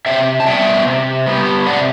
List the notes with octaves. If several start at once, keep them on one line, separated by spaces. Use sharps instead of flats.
C3 E5 G5
A5
G3 B3 E5 G5
C3
G3 B3
C3 D5 F#5